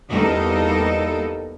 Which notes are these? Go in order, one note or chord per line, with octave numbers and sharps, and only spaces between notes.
E2 G3 A#3 D#4 A4 D#5